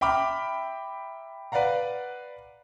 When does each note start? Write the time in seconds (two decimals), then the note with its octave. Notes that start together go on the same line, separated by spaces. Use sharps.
0.01 E5 G5 A#5 B5 D6 F6
1.52 B4 D5 F5 F#5 A#5